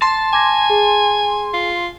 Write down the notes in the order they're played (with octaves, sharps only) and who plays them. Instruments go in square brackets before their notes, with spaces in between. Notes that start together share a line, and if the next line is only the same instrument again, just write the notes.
[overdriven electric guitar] A5 [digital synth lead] C6
[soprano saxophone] G#5 [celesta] D6 G#6 A#6
[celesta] G#4
[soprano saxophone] F4